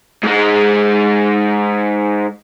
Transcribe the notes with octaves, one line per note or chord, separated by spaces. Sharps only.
G#2 G#3